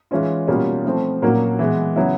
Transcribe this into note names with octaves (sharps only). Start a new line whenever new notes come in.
E3 G#3 C#4 F4
B2 G3 A#3 C#4 F4
F3 A3 C4
A#2 F#3 A#3 C#4 F#4
E3 G#3 B3
C#3 F#3 B3 E4